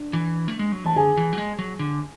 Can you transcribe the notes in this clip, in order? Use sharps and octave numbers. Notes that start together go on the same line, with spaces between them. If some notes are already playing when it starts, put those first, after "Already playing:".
Already playing: D4
E3
A3
G#3
F#3
E3 A5
D3 G#4 G#5
E3
F#3
G#3
F#3
D3